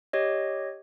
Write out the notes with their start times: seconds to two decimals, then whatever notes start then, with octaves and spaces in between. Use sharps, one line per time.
0.13 G4 C#5 D#5